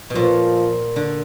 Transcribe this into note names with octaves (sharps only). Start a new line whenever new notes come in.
B2
A#2 F3
D3